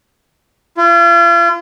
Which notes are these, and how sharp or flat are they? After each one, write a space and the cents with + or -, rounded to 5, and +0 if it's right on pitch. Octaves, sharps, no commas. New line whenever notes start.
F4 -40